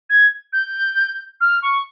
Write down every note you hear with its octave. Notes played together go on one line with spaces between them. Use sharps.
G#6
G6
F6
C#6